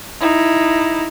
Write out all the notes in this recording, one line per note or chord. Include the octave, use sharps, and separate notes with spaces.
D#4 E4